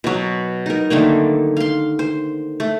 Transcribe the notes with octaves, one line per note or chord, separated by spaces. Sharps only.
B2 F#3
D#4 A#4
D3 D#3 A3 A#3
F5 C6
C5
A3